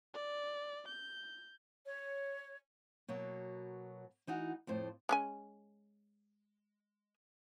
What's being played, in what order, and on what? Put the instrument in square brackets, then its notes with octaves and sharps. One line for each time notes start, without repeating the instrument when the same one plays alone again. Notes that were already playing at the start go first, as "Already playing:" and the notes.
[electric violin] D5
G6
[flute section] C#5
[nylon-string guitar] B2 F#3 A#3
E3 D#4 F#4 F#5
F2 A2 C5
[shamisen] G#3 C#4 G#5